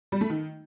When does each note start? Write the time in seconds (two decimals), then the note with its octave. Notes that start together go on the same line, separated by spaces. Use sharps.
0.12 G3
0.21 A3
0.30 D#3